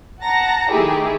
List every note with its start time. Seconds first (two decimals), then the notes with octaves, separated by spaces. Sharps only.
0.23 F#5 A5 A#5 A#6
0.70 D#3 A3 E4 G4 G#4 A#4